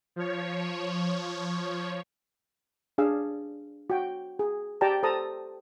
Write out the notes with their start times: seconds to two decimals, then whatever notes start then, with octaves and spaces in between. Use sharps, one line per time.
0.16 F3 C#5
2.98 D4 G#4 F5 E6
3.90 F#4 G5
4.39 G#4
4.81 G4 D5 G5 A5 A#5
5.03 A4 C5 A5 A#5 D#6